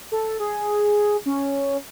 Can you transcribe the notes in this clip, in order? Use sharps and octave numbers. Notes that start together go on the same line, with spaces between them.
A4
G#4
C#4